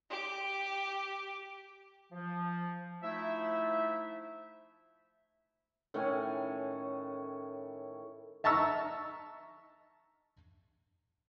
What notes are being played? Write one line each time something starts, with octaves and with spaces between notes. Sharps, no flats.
G4
F3
F3 A3 D#4 E4 E5
A2 D#3 C#4 G#5
E5 A5 A#5 C#6 E6